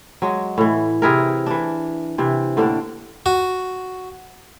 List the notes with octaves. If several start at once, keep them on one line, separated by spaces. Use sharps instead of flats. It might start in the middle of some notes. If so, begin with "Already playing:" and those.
F#3 G#3
A2 E3
C3 E4 G#4 A#4
E3 D4
C3 E3
A2 D3 A#3 D4
F#4